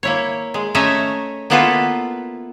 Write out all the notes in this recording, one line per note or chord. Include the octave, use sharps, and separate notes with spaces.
A#3 E4 C#5
G#3
A3 C#4 C#5 D#5 E5 A#5
A#3 B3 E4 F4 A4 B4